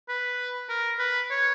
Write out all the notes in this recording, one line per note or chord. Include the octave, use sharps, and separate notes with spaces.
B4
A#4
B4
C#5